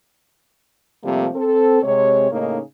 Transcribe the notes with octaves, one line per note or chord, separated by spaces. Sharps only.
C3 F3 G3 A3 A#3 C4
C4 A4
C3 G#3 C#5
A2 C#3 A#3 C#4 D#4